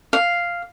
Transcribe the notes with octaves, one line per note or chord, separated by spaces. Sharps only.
F5